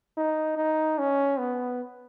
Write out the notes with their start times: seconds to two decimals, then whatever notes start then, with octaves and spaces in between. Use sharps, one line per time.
0.17 D#4
0.57 D#4
0.98 C#4
1.38 B3